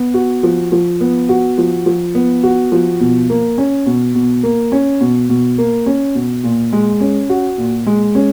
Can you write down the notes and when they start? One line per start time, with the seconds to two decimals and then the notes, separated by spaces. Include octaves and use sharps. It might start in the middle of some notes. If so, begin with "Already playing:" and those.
Already playing: B3
0.14 F#4
0.43 F3
0.72 F3
1.00 B3
1.29 F#4
1.58 F3
1.86 F3
2.15 B3
2.43 F#4
2.72 F3
3.01 B2
3.30 A#3
3.58 C#4
3.86 B2
4.15 B2
4.43 A#3
4.72 C#4
5.01 B2
5.29 B2
5.58 A#3
5.86 C#4
6.15 B2
6.43 A#2
6.73 G#3
7.01 C#4
7.29 F#4
7.58 A#2
7.87 G#3
8.15 C#4